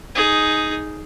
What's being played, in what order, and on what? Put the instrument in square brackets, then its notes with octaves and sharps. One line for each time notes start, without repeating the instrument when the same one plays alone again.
[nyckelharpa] D#4 G#4